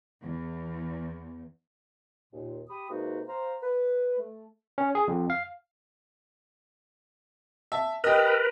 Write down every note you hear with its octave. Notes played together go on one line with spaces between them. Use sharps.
E2
D#2 A#2
G4 B5 D#6
C3 G#3 A#3 D#4 F#4 B4
C5 F5 A#5
B4
A3
C#4
G#4
F2
F5
E5 A5
G4 A#4 B4 D#5